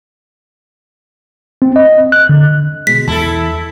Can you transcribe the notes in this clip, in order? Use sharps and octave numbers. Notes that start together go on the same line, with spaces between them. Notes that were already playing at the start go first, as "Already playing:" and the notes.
C4
D#5
F#6
D3
B2 G#3 B6
E2 E3 E4 A4 A5